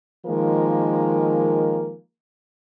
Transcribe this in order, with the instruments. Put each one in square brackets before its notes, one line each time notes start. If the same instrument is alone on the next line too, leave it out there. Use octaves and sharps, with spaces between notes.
[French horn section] D#3 F3 G#3 A#3 A#4